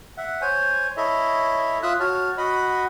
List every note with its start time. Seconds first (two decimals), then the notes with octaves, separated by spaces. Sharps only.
0.18 E5 F#5
0.42 C5 C#5 G#5
0.97 E4 A4 C#5 D#5 E5
1.83 F4 E5 D#6 E6 F#6
2.00 F#4 C#5 A5 F6
2.38 F#4 D#5 F#5 B5